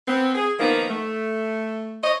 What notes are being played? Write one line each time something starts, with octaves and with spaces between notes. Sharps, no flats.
B3 C4
G#4
D#3 F3 A#3 B3 D#4
A3
C5 C#5 D#5